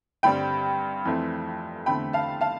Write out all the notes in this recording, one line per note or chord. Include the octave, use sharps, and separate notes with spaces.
G2 D3 G3 C4 G5 B5
F2 E3 A3 C4
E2 D3 A3 C4 G5 B5
F5 A5
F5 A5